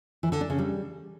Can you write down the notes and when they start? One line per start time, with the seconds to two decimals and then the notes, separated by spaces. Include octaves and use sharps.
0.23 E3
0.32 D3
0.41 D4
0.50 C#3
0.59 G3